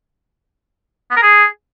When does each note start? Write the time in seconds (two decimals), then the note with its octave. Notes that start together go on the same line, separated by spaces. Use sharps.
1.11 B3
1.17 A#4
1.22 G#4